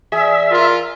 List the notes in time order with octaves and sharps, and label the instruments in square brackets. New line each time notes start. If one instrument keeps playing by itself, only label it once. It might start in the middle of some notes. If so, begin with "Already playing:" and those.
[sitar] E2 D5 [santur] G#4 [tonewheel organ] E5
[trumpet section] F4 A#4